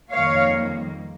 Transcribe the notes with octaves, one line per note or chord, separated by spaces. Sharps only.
F2 D#3 G3 A#3 C#5 F5